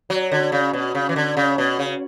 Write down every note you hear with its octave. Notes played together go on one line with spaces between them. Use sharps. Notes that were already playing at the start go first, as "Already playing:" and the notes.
F#3
D3
C#3
B2
C#3
E3
D3
C#3
B2
C#3